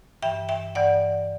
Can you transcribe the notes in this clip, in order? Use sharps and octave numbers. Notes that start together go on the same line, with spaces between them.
G2 E3 E5 G5
E5 G5
G2 E3 D5 F#5